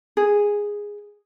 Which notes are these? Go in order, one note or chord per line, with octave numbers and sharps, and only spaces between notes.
G#4